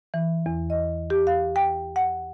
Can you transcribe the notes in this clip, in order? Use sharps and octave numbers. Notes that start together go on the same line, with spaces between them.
E3
E2
D#5
G4
F5
G5
F#5